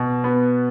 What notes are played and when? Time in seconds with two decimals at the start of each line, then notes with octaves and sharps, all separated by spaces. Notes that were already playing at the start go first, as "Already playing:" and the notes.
Already playing: B2
0.24 B3